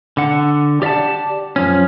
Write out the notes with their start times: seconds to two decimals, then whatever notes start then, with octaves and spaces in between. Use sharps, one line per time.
0.17 D3 F#5
0.82 G4 D5 E5 F#5 A5
1.56 F#2 F3 C#4